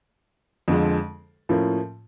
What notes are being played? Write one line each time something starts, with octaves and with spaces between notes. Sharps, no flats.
F2 D3 F3 G#3
A2 F3 A#3 C#4